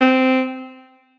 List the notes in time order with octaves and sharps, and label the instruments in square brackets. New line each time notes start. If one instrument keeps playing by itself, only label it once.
[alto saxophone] C4